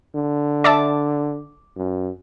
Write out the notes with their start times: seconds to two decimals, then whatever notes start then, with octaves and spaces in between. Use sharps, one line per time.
0.15 D3
0.64 D5 E5 A5 D6
1.77 F#2